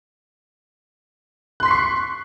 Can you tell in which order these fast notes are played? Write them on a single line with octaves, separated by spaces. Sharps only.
F#6 C6 B6 C7 C#6